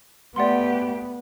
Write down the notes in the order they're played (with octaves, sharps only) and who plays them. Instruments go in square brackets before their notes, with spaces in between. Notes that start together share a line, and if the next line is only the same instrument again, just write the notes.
[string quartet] A3 G4 [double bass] B3 [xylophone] D5 F#5 C6